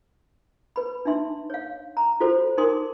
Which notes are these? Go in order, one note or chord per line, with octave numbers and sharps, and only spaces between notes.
B4 B5
D4 D#4 E5 C6
C#5 F5
A#5
F4 F#4 A4 C5
D#4 A#4 G#5 C6 D6 D#6